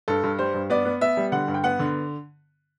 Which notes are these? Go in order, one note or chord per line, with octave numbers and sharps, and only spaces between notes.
G2 A4
G2
G3 C5
G2
B3 D5
B3
B3 E5
G3
D3 F#5
G2
G5
B3 F#5
D3